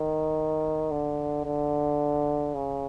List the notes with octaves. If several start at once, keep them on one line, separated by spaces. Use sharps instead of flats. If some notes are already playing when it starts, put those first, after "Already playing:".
Already playing: D#3
D3
D3
C#3